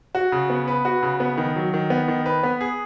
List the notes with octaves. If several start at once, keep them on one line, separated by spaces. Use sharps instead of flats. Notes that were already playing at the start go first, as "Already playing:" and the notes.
F#4
C#3
B3
B4
F#4
C#3
B3
D#3
F#3
D#3
B3
D#3
B4
B3
G#4